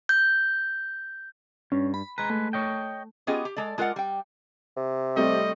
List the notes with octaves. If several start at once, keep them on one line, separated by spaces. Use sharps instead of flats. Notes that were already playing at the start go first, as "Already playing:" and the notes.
G6
G2 C#4
B5
G#3 B4 A#5
A3
C#5 D#5 G5
B3 C#4 F4 G4 G#4 D#5
G4
G#3 A4 D5
G#3 F4 A#4 D5 F#5
G3 G5
C3
G3 A3 C4 D#5